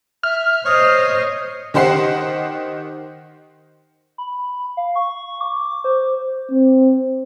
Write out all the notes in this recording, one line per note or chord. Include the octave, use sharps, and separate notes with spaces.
E5 F6
C5 C#5 D#5 D#6
D#3 G4 C5 F#5 C7
B5
F5
C#6
D6
C5
C4